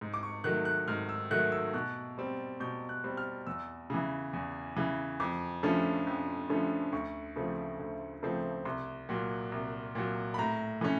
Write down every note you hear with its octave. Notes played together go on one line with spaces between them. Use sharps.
G#2
D6
C#6
D#3 F#3 A3 F#6
F#6
G#2 F6
E6
D#3 F#3 A3 F#6
E6
B2 F#6
G3 C4
B2 G6
F#6
G3 C4
F6
E2 E6
C#3 E3
E2
C#3 E3
F2 D6
D3 F3 A3 C#4
F2
D3 F3 A3 C#4
D2 C#6
C#3 F3 A3 C4
D2
C#3 F3 A3 C4
C2 C6
A#2 F#3
C2
A#2 F#3
B5
A2 A#5
E3 A3 C#4